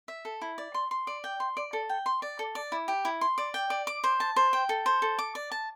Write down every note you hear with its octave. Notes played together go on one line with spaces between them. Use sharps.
E5
A4
E4
D5
C6
C6
D5
G5
C6
D5
A4
G5
C6
D5
A4
D5
E4
G4
E4
C6
D5
G5
D5
D6
C5
A5
C5
G5
A4
C5
A4
D6
D5
A5